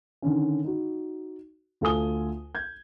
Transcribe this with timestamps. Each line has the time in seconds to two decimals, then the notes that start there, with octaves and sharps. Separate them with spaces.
0.22 D3 D#3 C#4
0.64 D#4 F#4
1.81 D2 F4 A4 G#5 D#6 G7
2.55 G6 G#6